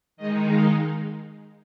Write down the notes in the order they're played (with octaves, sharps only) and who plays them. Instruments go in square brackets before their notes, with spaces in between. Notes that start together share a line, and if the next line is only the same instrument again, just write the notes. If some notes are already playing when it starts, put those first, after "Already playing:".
[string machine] D#3 G#3 D#4 D#5
F5